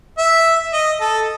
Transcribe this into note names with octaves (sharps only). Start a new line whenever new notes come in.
E5
D#5
A4